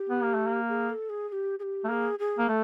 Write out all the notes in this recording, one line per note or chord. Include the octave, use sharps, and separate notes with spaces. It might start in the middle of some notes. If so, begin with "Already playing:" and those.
Already playing: G4
B3
A#3
A3
A#3
G#4
A4
G#4
G#4
G4
G#4
G4
A3
A#3 G#4 A4
G#4
A#3
A3 A4